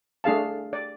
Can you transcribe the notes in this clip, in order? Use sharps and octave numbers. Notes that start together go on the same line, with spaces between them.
A3 D4 G#4 F5 A5
D5